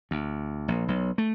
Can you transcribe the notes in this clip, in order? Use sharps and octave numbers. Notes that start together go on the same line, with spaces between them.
D2
A#1
B1
A3